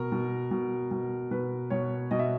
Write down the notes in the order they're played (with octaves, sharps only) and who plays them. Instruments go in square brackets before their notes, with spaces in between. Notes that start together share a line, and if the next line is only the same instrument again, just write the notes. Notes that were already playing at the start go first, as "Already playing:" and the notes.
Already playing: [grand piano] B2 A#4
B2
B2
B2
B2 B4
B2 C#5
B2 D#5
E5